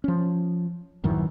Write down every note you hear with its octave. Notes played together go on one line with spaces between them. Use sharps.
F3 C#4
D1 F#2 D#3 E3